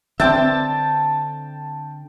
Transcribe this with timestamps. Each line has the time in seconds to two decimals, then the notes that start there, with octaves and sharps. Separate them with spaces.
0.20 D3 C4 D5 E5 G5 A5